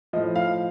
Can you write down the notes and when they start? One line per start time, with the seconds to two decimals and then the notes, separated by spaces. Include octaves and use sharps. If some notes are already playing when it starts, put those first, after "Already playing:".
0.13 A2 F3 D#5
0.36 F5